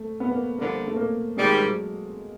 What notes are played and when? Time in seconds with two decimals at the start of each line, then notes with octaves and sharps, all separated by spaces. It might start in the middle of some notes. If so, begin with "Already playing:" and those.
Already playing: A3
0.20 B3
0.31 A#3
0.57 G2 D3 F3 A#3
0.87 A3
0.96 A#3
1.37 G#2 D#3 G3 G#3
1.63 F#3